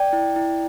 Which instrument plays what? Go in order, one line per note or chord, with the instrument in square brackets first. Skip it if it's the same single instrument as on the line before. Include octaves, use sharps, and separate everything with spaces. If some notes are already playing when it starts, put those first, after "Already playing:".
Already playing: [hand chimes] D5 G5
E4
E4